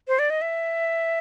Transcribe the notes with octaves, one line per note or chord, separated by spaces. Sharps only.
C5
D5
D#5
E5